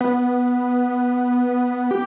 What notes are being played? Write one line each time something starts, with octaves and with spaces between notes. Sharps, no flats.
B3
G4